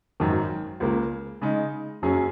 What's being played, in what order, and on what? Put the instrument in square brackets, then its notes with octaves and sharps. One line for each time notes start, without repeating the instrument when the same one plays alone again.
[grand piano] G#1 F#2 D#3
C#2 C#3 A#3
C#3 G#3 D#4
F#1 F#2 F#3 C#4 G#4